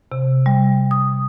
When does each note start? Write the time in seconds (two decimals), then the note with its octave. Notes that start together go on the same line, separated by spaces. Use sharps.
0.12 C3
0.46 G3
0.91 D#6